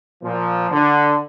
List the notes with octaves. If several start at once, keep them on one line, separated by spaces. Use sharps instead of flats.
A#2 F3
D3